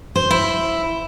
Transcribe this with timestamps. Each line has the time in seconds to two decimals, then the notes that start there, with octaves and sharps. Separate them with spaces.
0.16 C5
0.31 E4